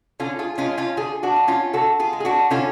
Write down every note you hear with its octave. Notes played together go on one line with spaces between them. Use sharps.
D3 C#4 F4
F4 G#4
G#3 C#4 F4
C#4 F4
D3 F4 G#4
D4 F#4
G#3
C#4 F4
D3 F#4 A4
F4 G#4
G#3
G#4
D4 F#4
D3 C#4 F4